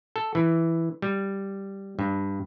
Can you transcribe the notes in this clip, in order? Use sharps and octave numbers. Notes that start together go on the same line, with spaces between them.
A4
E3
G3
G2